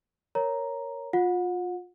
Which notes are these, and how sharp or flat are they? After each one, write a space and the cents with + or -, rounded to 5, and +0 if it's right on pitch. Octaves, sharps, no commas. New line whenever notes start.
A#4 +0 C#5 +0 A#5 +0
F4 +25 F#5 -30